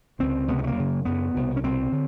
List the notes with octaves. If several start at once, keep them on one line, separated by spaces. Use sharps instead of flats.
C#2 C3 C4
C#2 C3 B3
C4
A3
A#3
F#2 C#3
F#2 C#3 B3
C2 B2
C#4
C2 B2 C4
D3